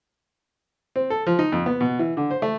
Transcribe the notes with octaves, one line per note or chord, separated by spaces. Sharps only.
C4
A4
F3
D#4
F2
B3
B2
E3
D3
C5
A3